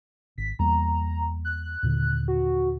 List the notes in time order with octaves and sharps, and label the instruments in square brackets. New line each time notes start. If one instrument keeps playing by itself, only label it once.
[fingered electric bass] G#1 [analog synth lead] B6
[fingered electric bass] E2 G3 A#3 [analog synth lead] A#5
[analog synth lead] F#6
[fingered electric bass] D#2 A#2 D3
[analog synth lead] F#4